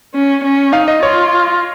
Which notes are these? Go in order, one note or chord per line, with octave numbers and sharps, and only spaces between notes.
C#4
C#4
D#4 F5
D#5
F4 C#5